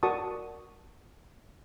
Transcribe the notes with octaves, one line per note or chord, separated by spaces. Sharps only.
F#4 A#4 D5 A5 C#6 D#6